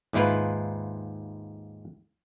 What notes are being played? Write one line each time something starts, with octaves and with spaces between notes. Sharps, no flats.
D#2 G#2 E4 F4 B4